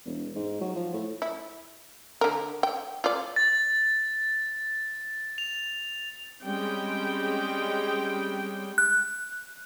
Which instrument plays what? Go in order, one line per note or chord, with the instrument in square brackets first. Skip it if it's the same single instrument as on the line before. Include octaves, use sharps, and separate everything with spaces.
[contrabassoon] E1
G#2
F#3
F3
A2
[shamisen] E4
D3 A#4
G5
F4 D5
[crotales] A6
F7
[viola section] G3 G#3 C4 C#4 G5
[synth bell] F#6